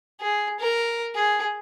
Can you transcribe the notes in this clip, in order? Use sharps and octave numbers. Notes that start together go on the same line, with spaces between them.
G#4
A#4
G#4